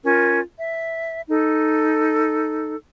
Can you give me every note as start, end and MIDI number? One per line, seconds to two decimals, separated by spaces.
0.04 0.40 61
0.04 0.40 65
0.04 0.40 70
0.57 1.20 76
1.28 2.75 63
1.28 2.75 69